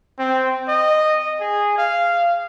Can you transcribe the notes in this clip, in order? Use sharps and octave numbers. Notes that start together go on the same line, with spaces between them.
C4
D#5
G#4
F5